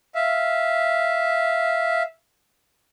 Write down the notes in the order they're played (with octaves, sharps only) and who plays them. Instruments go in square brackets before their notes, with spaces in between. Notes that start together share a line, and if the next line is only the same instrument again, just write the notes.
[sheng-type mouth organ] E5 F5